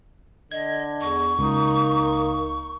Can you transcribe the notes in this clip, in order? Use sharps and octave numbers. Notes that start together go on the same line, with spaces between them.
D3 D#5 G#6
E2 C#6
C#2 A#3 D#4